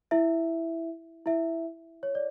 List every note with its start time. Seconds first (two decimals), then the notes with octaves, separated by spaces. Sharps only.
0.11 E4 E5
1.26 E4 E5
2.03 C#5
2.15 D5